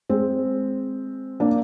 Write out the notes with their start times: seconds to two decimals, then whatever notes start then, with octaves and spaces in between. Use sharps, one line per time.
0.09 G#3 C4
1.40 A#3 D4